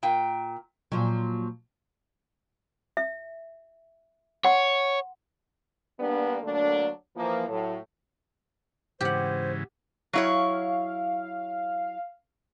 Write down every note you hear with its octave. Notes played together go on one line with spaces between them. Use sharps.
A#2 G5
A#2 F3 F#3
E5
C#5 F#5 C6
G3 A#3 B3 D4
D3 F#3 A3 A#3 D4
E3 F3 A#3
A2 F#3
G#2 C#3 E3 G4 C5 F#5
F#3 E4 C#5 F5